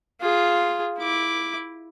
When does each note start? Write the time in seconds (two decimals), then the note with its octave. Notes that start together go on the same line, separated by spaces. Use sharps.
0.21 F4 G#4
0.98 E4 D6